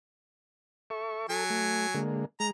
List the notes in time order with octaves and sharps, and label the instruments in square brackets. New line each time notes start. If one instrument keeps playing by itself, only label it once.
[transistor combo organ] A4 E5 C#6
[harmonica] F#3 G#5 [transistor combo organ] A4
[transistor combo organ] A3
D3 G#3 A#3
[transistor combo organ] G#3 [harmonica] A#5